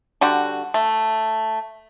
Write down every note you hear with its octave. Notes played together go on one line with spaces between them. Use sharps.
D3 G3 D4 F#4
A3